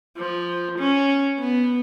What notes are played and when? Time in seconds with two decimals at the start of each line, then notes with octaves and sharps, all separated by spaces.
0.18 F3
0.79 C#4
1.40 B3